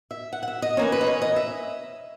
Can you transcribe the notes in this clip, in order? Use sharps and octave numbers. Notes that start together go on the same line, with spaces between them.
E5
F#5
F#5
E5
D#5
E3 A#3 C#4 C#5
B4
D#5
C#5
D#5
E5